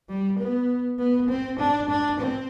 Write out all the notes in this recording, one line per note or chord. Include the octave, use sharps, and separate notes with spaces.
G3
B3
B3
C4
D4
D4
C4